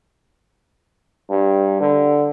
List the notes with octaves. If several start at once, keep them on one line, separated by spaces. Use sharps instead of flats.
G2
D3